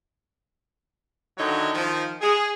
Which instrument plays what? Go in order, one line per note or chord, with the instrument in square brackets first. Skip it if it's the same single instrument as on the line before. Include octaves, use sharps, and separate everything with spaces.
[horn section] D3 D#3 F#3 D#4 E4 C#5
D#3 F3
G#4